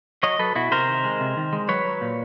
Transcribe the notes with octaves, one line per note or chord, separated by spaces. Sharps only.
F#3 C#5 D#5
F#3 A4 B4
B2 E4 F#4
C3 A#4 C5
D#3
G#3
C3
D#3
G#3
F#3 B4 C#5
F#3
A#2